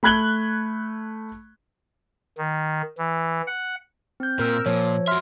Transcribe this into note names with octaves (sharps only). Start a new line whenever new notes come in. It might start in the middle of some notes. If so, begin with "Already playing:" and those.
A3 B5 F#6 G#6 F#7 G7
D#3
E3
F#5
C4 G6
A#2 A#4 E6
A#2 F3 C#5
F#4 E5 C6 F6